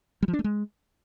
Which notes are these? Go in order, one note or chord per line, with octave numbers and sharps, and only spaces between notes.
G3
F3
D4
A3
G#3